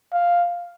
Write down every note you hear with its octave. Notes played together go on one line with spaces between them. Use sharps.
F5